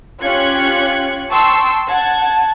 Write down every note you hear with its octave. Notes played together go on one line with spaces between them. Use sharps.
C#4 F4 G4 F#6 G#6 C#7
G5 A5 C6 C#6 E6
F#5 A5 G#6